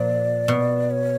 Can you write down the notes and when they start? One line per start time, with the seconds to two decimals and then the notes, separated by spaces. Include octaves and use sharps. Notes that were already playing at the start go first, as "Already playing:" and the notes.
Already playing: A#2 F3 D5
0.48 B2
0.91 C#5